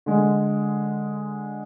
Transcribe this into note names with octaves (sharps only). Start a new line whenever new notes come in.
D3 G#3